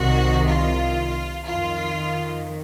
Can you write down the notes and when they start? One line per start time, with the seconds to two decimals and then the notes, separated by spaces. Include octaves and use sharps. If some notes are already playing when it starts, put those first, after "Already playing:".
Already playing: C2 C3 D#3 F#4
0.49 F4
1.45 F2 D#3 F4